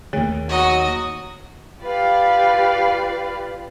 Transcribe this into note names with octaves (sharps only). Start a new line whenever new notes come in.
D#2 D#3 A3 G#4 C#5
F#3 F#4 D#5
F4 G4 B4 D5 F5